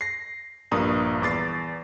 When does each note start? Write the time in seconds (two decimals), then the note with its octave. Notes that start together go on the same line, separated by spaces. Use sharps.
0.01 A#6 C7
0.71 A#1 G2 A#3 A#5 D#6
1.22 E2 D6 A6 C7